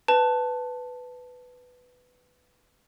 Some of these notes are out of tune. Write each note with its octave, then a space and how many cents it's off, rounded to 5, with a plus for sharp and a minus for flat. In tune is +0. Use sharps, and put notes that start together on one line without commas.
B4 +10 A5 +0